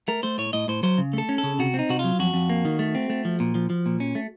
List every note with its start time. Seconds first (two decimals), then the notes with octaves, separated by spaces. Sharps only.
0.08 A3 A#4
0.23 A3 C5
0.38 A2 C#5
0.53 A2 D#5
0.68 A2 C5
0.83 F#3 C5
0.98 C#3
1.13 A3 A4
1.29 C#4
1.38 A4
1.43 C#3
1.59 C3 F#4
1.74 C4 D#4
1.89 C3 F#4
1.99 F#3 F4
2.19 F2 F#4
2.34 F2
2.50 A#3
2.65 D#3
2.79 A3
2.95 C4
3.10 A3
3.25 F3
3.40 A#2
3.55 F3
3.70 F3
3.86 A#2
4.00 C#4
4.15 A3